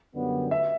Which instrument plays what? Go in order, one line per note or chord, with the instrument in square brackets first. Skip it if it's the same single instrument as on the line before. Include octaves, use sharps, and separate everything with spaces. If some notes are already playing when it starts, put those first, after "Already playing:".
[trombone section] F#2 D3 G3 B3
[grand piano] E5